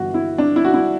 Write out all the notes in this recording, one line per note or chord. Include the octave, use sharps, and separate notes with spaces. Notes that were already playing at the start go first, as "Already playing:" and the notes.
Already playing: G1 G2 E3 F#4
E4
D4
E4
F#4
E4